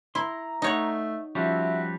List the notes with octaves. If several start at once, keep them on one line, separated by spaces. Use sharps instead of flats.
E4 A#5 C6
A3 D#4 C#5 F#5
F3 G3 C#4 F#4 E5